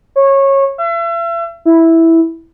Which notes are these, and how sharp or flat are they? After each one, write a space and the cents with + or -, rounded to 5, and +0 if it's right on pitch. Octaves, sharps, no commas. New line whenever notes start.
C#5 -20
E5 +40
E4 -5